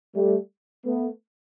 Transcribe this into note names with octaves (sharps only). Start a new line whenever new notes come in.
G3 A3
A3 B3